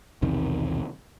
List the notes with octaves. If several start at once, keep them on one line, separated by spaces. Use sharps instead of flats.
B1 E2 C3 D#3